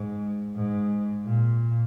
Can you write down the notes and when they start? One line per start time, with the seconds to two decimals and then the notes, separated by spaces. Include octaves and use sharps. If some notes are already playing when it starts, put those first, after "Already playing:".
Already playing: G#2
0.56 G#2
1.25 A#2